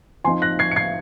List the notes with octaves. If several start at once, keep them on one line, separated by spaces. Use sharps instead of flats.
F3 C4 D#4 G#5 C6
F#6 A#6
G#6 C7
C#7
G#6 C7